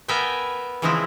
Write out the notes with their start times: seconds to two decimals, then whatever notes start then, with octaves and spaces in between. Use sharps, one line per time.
0.08 B3 A#4 B4 E5 G5 G#5
0.82 C#3 E3 F3 G#3 C4 E4